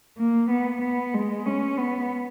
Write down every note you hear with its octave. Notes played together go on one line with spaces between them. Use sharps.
A#3
B3
B3
G#3
C#4
B3